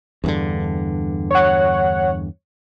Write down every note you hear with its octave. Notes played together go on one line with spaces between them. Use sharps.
E2 G2 D3
C#5 F#5